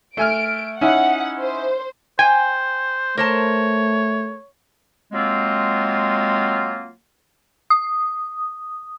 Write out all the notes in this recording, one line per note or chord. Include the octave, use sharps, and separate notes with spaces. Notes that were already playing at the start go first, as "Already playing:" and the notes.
A3 G#5 F6 D7
C#4 D#4 E4 F#5
C5
C5 G5 G#5
A3 A#4 C5 C#5 A5
F#3 G#3 A#3 C4 F4
D#6